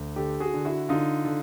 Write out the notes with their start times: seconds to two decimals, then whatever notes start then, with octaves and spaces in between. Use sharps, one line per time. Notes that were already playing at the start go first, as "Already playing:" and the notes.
Already playing: D2
0.16 D3 G4 A4
0.40 F#4 G#4
0.54 D3
0.65 E4 F#4
0.89 D3 D#4 F4
1.25 D3